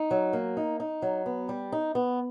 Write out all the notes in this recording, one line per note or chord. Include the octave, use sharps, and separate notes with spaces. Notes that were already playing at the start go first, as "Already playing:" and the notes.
Already playing: D#4
F#3
A#3
D#4
D#4
F#3
B3
G3
D#4
B3